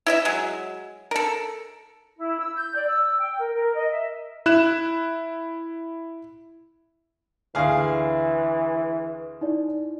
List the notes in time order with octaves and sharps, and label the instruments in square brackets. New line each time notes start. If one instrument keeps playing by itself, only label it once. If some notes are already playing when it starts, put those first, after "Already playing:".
[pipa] E4 D#5 E5
F#3 G#3
A4 A#4
[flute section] E4
E6
G6
D5
E6
G5
A#4
A#4
D#5
E5
[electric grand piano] E4 F#6 E7
[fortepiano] D2 G#4 F5 [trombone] E3
[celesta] D#4 E4 D5